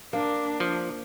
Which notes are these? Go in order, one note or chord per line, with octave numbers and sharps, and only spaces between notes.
A#3 D4
F3